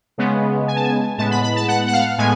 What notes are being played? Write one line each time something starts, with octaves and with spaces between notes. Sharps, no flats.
C#3 G#3 B3
G#5
A5
G#5
A2 G#3 B3 A5
B5
B5
A5
F#5
F#5
F5
A2 G#3 B3 G#5